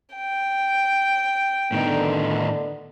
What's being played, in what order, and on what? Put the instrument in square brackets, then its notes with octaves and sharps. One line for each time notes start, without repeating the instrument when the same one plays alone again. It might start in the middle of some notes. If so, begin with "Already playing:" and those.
[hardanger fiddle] G5
[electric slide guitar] A2 D#3 D#4 [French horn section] D3 B3